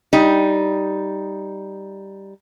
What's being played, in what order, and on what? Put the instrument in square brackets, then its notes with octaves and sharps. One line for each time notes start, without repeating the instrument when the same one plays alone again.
[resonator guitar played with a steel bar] G3 D#4